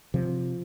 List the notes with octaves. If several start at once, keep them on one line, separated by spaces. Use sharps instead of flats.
C3 F3